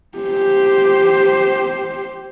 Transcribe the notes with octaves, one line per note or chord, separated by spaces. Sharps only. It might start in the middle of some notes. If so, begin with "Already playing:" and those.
G4 C5